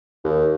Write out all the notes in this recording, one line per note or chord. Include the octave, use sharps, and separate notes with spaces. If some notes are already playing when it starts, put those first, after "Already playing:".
D#2